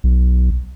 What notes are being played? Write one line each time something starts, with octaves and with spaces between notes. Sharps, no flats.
B1